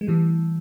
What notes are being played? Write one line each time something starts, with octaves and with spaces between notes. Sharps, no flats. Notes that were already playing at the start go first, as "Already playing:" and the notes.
G#3
A2 E3 G3